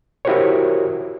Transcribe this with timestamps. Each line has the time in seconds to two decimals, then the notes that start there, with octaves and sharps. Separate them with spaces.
0.25 E4 F#4 G4 A#4 C5 C#5